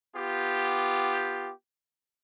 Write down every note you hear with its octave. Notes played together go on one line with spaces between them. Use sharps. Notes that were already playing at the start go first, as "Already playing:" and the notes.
B3 F4 G4